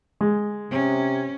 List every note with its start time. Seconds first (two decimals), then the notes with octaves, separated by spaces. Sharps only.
0.21 G#3
0.71 C3 C#4